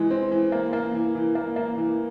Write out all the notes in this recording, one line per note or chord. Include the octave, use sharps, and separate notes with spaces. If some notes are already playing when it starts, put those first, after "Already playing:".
Already playing: E3 G#3
C4
E3
A#3
A#3
E3
E3
A#3
A#3
E3